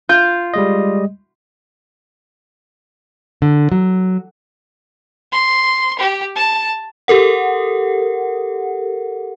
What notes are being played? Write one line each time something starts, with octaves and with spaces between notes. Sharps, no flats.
F4 G6
G3 G#3 D#5
D3
F#3
C6
G4
A5
G4 A4 A#4 F#5